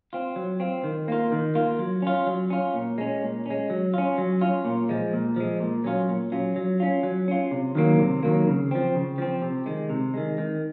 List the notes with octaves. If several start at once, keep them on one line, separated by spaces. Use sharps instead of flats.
C4 F4
F#3
C4 F4
D#3
A#3 F4
D#3
A#3 F4
F#3
C#4 F4
F#3
C#4 F4
A#2
G#3 C#4
A#2
G#3 C#4
F#3
C#4 F4
F#3
C#4 F4
A#2
F3 G#3
A#2
F3 G#3
A#2
F#3 C#4 F4
A#2
F#3 C#4 F4
F#3
C#4 F4
F#3
C#4 F4
C3
D#3 F#3 A#3
C3
D#3 F#3 A#3
C#3
F3 C4
C#3
F3 C4
C3
D#3 G#3
C3
D#3 G#3
D#3